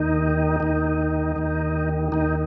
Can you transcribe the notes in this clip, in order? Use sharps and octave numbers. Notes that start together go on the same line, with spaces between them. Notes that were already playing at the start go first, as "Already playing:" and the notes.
Already playing: D#2 D#3 D#4
D#2 D#3
D#2 D#3
D#2 D#3 D#4